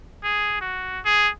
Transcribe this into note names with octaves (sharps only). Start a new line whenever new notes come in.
G#4
F#4
G#4